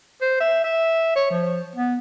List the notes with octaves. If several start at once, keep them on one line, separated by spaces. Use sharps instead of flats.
C5
E5
E5
C#5
F3
B3